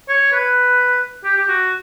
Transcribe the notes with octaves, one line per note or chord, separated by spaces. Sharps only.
C#5
B4
G4
G4
F#4